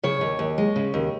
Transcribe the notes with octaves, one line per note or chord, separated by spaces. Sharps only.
C#3 C#5
D#2
D#2
G#3
C#3
D#2